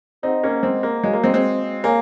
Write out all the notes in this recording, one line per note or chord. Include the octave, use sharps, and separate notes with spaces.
C4 D#4 G#4 C5 D#5 F#5
A#3 C#4
G#3 C4
A#3
G#3 F#4 C#5 F5 G#5
A#3
G#3 C4
G#3 C4
A#3 C#5 F5 G#5